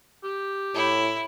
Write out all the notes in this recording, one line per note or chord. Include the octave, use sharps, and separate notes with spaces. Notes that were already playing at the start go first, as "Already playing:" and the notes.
G4
A2 E4